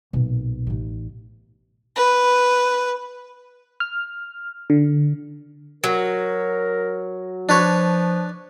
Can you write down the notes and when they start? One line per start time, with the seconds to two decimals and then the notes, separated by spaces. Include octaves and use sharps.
0.13 B1 A#2
0.67 A1 D#4
1.96 B4
3.80 F6
4.70 D3
5.84 F#3 A#4
7.49 F3 D4 B4 C#5